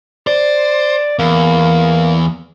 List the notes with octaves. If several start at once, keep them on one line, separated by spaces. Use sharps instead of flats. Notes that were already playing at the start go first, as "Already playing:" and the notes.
C5 D5
E2 A#3